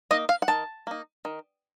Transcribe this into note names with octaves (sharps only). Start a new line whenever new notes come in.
A#3 D#4 D#5
F5
F#5
D#3 A5
A#3 D#4
D#3